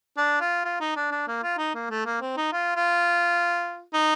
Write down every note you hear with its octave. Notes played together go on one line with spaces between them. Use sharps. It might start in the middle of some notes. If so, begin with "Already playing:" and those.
D4
F4
F4
D#4
D4
D4
A#3
F4
D#4
A#3
A3
A#3
C4
D#4
F4
F4
D#4